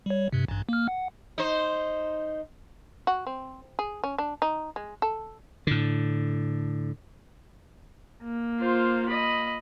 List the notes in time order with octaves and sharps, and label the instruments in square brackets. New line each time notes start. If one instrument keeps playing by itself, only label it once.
[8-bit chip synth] G3 C#5
G2 C3
A1 G2
A#3 F6
F#5
[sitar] D#4 C5
[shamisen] F#4
C4
G#4
C#4
D4
D#4
G#3
A4
[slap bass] A2 D3
[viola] A#3
[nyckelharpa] F4 C5
D#5 B5